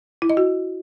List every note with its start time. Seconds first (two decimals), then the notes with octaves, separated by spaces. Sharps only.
0.22 E4
0.30 D#5
0.37 F#4